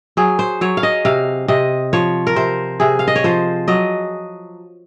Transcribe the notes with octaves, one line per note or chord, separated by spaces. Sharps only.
F#3 G#4
C5
F#3 C#5
F5
D#5
C3 F5
C3 D#5
F3 C#5
A#4
C3 C5
C3 G#4
F5
D#5
C#5
F3 C5
F#3 D#5